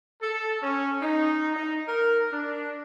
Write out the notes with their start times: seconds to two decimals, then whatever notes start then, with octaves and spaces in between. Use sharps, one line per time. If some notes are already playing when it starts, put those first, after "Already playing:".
0.22 A4
0.62 C#4
1.01 D#4
1.55 D#4
1.88 A#4
2.31 D4